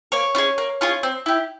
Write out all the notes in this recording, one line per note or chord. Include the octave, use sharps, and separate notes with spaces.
A#3 C#5
C#4 F4 G#4
A#3
C#4 F4 G#4
C4
E4 G4